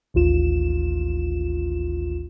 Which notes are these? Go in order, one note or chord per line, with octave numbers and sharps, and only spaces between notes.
A1 D#2 F4 E7